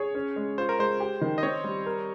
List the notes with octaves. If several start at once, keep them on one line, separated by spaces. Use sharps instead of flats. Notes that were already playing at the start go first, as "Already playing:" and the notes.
Already playing: G#4 C#5
C#4
G#3
F4 C5
A#4
G#3 C5
G4
D#3
D#5
C4 C#5
G3
A#4